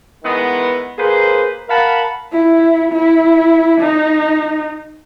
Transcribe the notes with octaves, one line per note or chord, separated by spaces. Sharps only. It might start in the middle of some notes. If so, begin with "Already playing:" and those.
D#3 E3 G#3 B3
A#3 G#4 B4 C5
A#4 F5 F#5 A5 B5
E4
E4
D#4